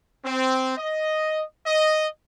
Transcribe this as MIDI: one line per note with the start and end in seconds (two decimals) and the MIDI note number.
0.25 0.77 60
0.78 1.43 75
1.66 2.06 75